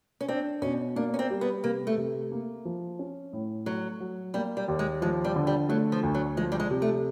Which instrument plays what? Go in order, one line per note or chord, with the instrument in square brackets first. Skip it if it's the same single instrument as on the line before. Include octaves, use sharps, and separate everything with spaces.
[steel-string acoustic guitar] C#4
[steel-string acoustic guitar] C4 [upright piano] D4
[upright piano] B2 [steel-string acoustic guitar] C#4
[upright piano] A#3 [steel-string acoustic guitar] D4
[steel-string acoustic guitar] C#4
C4
[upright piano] G3
[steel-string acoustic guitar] B3
[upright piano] C3 [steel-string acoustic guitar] A#3
[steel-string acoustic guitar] A3
[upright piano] C3
A#3
F3
C#4
A2
[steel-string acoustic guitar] F#3 [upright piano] A3
[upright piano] F#3
[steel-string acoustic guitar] G3 [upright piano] A#3
[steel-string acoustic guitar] G3
[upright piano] D#2
[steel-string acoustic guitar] G#3
[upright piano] F3 [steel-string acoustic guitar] G#3
[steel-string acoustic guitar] G3
[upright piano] D3
[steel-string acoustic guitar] G3
[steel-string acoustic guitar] F#3 [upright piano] A3
[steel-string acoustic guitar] F3
[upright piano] D2
[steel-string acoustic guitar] F#3
[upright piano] F3 [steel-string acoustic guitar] G#3
[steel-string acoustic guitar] G3
G#3
[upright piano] C3
[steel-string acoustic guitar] A3